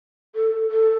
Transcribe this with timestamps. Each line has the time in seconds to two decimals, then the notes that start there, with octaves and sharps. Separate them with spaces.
0.35 A4
0.71 A4